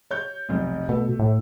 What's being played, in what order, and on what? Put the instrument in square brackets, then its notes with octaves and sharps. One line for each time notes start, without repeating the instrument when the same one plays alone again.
[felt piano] C#5 G6
F1 B1
[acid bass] B2 [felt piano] A3
[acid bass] A2